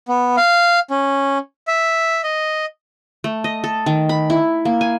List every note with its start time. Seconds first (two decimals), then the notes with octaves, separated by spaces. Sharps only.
0.08 B3
0.37 F5
0.90 C#4
1.67 E5
2.23 D#5
3.24 A3
3.44 D#5
3.64 A4
3.86 D#3
4.09 B5
4.30 E4
4.65 A#3
4.81 G#5